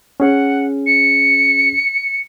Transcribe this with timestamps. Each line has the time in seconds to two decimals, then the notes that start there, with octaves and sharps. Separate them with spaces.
0.20 C#4 G#4 F#5
0.86 C#7